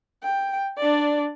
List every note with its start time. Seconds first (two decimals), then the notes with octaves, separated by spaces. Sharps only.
0.23 G5
0.77 D4 D5